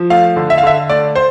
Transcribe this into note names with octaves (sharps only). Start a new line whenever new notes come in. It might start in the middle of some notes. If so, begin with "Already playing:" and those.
Already playing: F3
A3 F5
D3
E5
F5
D3 E5
A3 D5
C5